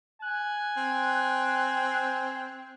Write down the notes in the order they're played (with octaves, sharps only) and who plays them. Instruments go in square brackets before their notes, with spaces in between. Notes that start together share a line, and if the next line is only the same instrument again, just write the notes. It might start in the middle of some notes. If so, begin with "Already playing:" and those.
[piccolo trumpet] G#5 [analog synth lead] F#6
[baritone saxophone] C4